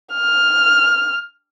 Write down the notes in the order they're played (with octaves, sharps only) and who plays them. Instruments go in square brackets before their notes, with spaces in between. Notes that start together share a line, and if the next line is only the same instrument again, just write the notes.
[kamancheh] F6